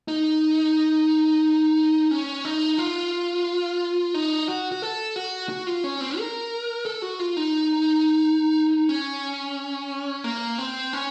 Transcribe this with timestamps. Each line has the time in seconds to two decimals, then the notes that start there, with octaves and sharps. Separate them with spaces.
0.08 D#4
2.11 C#4
2.45 D#4
2.78 F4
4.14 D#4
4.48 F#4
4.72 F#4
4.82 A4
5.16 F#4
5.49 F#4
5.67 F4
5.84 C#4
6.01 C4
6.18 A#4
6.85 A4
7.02 F#4
7.20 F4
7.37 D#4
8.89 C#4
10.24 A#3
10.58 C4
10.93 C#4